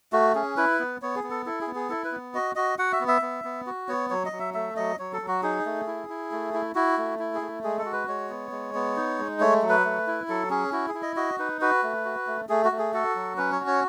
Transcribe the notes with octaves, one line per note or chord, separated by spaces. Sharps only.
A3 F#4
C#4 G#4
E4 B4
B3
B3 C#5
G#4
B3
A4
E4 A4
G#4
B3
G#4
E4 A4
B4
B3
F#4 D#5
F#4 D#5
F#4 F#5
E5
B3
E5
B3
B3
F#4
B3 C#5
F#3 C#5
D#5
F#3
E5
A3 E5
F#3 D#5
F#3 C#5
A4
F#3
F#4
D#4 G#4
A3
E4
E4
A3
E4
E4 F#4
A3
E4
G#4
A3
G#3 G#4
A4
F#4
B4
G#3 C#5
B3
G#3
B3
D#4
G#3
A3 C#5
F#3
B4
A3
E4
F#3 A4
C#4 G#4
E4 F#4
G#4
E4
D#5
F#4 D#5
D#4 B4
F#4 B4
A3
F#4
A3
A3 G#4
F#4
A3
G#4
F#4 A4
F#3
C#4 B4
C#5
F#4
C#5